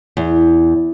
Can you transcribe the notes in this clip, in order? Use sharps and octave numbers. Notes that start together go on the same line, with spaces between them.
E2